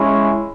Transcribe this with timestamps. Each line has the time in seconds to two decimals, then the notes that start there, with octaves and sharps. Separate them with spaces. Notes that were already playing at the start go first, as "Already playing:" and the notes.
Already playing: G#3 C#4 E4